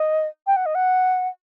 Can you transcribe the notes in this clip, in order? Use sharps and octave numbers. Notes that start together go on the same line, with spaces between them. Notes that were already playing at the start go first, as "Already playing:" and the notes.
Already playing: D#5
G5
F#5
D#5
F#5